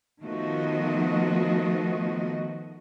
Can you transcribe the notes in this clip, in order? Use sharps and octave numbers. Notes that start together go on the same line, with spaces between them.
D#3 F3 A3 B3 F#4 D#5